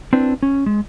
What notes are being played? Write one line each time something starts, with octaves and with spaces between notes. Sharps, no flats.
C4 D4 E4 B4
C#4
G#3